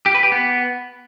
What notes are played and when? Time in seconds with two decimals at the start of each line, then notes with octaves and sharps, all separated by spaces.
0.06 G4
0.15 B4
0.23 G4
0.32 B3